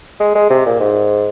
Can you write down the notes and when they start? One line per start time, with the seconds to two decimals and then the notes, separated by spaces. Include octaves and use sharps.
0.20 G#3
0.35 G#3
0.50 C3
0.66 A#2
0.80 G#2